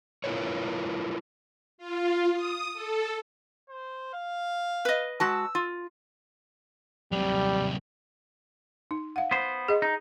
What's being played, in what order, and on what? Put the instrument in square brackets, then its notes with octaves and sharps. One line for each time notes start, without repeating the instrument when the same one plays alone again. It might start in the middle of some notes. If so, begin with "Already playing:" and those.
[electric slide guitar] E4 F4 A#4 B4 C#5
[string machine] F4
D#6
A4
[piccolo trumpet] C5
F5
[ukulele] B4 D#5
[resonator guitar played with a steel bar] G#3 F#4 A5 [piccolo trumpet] E6
[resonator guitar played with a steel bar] F4
[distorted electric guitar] C3 F#3 [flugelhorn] G3
[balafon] D#4
F5 F#5
[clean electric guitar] B3 C5
[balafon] G#4 D#5
[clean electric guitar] D#4